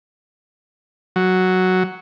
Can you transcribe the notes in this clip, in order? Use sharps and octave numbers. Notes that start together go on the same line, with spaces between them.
F#3